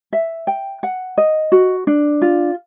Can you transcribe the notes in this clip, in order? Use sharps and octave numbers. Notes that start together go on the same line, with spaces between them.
E5
G5
F#5
D#5
F#4
D4
F4